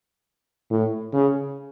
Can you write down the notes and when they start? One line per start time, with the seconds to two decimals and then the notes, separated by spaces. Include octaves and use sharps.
0.71 A2
1.13 C#3